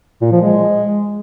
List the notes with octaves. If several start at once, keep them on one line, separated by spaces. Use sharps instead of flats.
A#2
F3
G#3